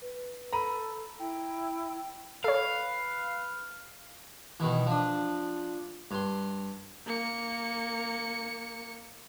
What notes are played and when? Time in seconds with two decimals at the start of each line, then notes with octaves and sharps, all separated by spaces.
0.02 B4
0.53 A4 A#5 B5 D#7
1.19 E4 G5
2.44 A4 B4 C#5 F5
4.60 B2 D#3 E3
4.87 F3 D4
6.11 G2 C6
7.06 A#3 C#7